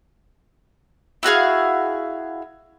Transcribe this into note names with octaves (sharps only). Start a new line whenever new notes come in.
E4 F#4 G#4 F5